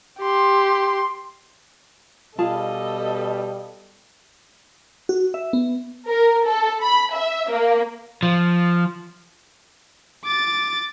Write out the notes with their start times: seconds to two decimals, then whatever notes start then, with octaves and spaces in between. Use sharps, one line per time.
0.20 G4 C6
2.39 B2 G3 F4 G#4 A4 D#5 A5
5.09 F#4
5.34 E5
5.53 B3
6.08 A#4
6.46 A4
6.82 B5
7.14 E5
7.50 A#3
8.23 F3
10.25 D6 A6